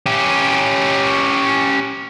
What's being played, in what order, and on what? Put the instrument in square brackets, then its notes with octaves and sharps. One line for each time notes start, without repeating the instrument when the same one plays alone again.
[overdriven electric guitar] C#4 G4